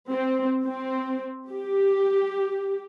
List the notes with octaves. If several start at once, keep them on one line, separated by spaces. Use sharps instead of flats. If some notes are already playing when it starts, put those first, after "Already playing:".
C4
C4
G4